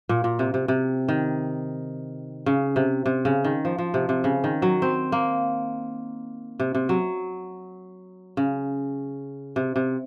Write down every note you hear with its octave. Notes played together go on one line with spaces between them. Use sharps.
A#2
A#2
C3
C3
C3
D#3
C#3
C3
C3
C#3
D#3
F3
F3
C3
C3
C#3
D#3
F#3
C4
A#3
C3
C3
F#3
C#3
C3
C3